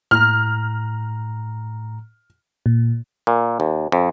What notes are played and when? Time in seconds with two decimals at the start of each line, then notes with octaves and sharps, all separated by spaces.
0.11 A2 A#5 F6
2.66 A#2
3.27 A#2
3.60 D#2
3.92 F2